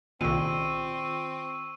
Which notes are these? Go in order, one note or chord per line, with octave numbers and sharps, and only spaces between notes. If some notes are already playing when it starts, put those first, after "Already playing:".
C2 A#2 D#3 C4 F4 C#6 E6 D#7